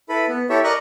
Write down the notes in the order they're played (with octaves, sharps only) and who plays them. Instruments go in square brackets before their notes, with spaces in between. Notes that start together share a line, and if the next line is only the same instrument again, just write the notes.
[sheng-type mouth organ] E4 A4 B4 B5
B3
E4 G4 A4 C#5 E5
A#4 D5 D#5 A#5 C#6 F#6